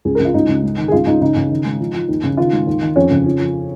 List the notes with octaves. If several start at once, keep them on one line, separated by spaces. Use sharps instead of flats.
C#2 G#4
A#4
C#3 F4
C#2 D#4
C#2
G#2
D#3
G#4
C#2 F4
C#2 D#4
C#3 D#4
C#3
D#3
G#2
F3
F3
D#2
C#3
D#3 F4
G#2
D#2
D#3
F2 C#4
C#3
F3
F3